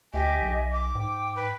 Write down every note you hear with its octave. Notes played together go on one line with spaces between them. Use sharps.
D2 G4 D#5 E5 G#5
B1
D6
G#2 G5
B4